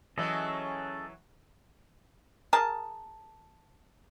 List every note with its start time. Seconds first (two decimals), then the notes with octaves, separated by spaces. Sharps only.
0.18 E3 F#3 C#4 G#4 A4 D#5
2.53 G#4 A#4 A5